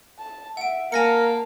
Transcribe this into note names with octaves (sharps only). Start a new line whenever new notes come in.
A5
E5 F#5 D7
A#3 A#4 F5 G#5 A5 A#6 C#7